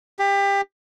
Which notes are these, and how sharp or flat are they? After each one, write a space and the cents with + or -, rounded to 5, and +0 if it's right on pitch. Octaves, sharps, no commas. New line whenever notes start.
G4 +25